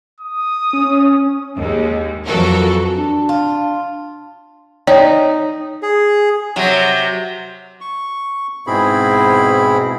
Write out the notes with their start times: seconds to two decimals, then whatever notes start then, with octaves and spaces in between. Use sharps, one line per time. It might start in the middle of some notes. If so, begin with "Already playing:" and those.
0.20 D#6
0.73 C#4
1.56 D#2 G#3
2.25 F2 E3 F#3 F#4 A4 A#4
2.97 D4
3.29 F4
4.87 D#4 C#5 D5 G5
5.83 G#4
6.56 C3 F#3
7.81 C#6
8.67 G#2 B2 C4 E4 G#4 B5